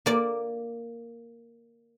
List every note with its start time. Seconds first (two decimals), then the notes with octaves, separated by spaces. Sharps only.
0.06 A#3 D5